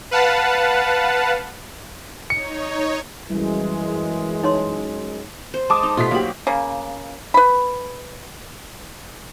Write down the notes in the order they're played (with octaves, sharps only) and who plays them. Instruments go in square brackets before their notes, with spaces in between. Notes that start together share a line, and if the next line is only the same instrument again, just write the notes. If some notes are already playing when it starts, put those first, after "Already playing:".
[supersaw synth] B4 F5 F#5 A5
[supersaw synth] D#4 C#5 [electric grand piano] C#7
[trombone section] F#2 G#3 [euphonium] E3 [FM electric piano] G3 E4
[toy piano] D#4 C#5 C6
[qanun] C5
[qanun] G#3 [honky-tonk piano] A5 D6 D#6
[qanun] D#4
[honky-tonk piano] B2 A3 B6 [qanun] F4 G4
[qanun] F#3 B5 [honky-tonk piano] A#3 G4
[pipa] C#3 A#3
B4 B5